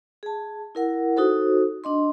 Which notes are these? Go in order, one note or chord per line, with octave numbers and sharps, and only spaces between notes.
G#4 A5
E4 A#4 F#5
D#4 F#4 A4 C5
D4 D#5 C6